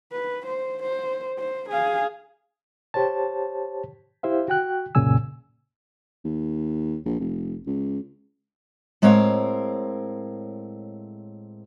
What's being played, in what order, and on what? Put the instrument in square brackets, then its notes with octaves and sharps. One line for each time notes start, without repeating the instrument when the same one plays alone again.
[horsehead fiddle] B4
C5
C5
C5
G#4 F5
[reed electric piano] G4 C5 C#5 A5
E4 G4 C5 E5 F5
F#4 G5 F#6
C2 F#2 A#2 C#3 G#5 E6
[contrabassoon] D#2
A#1
F1
C#2
[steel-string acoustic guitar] A2 G#3 C4 A#4 C#5 F5